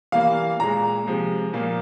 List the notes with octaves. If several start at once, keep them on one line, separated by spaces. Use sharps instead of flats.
E3 G3 A#3 F5
A#2 G#3 A#5
C3 F3 G#3
A#2 F3 A#3